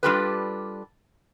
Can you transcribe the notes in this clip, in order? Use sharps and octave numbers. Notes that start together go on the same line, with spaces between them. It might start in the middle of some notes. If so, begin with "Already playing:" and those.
G3 D4 F4 G4 A4 B4